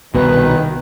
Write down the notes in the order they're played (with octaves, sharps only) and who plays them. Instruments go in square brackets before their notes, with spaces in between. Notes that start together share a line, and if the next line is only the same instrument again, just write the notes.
[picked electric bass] C2 B2 [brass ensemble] D#3 [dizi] B4